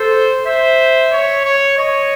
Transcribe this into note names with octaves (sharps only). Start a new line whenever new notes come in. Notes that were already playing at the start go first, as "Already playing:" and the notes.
Already playing: A4 C5
C5 E5
C#5
C#5
C#5 D#5